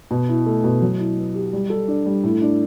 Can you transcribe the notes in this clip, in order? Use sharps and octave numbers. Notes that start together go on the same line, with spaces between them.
B2
E4
A3
B2
F#3
E4
B3
G4
G3
A4
D4
G3
A2
D4